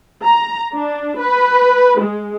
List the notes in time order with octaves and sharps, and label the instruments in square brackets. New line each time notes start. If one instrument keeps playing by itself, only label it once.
[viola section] A#5
D4
B4
G#3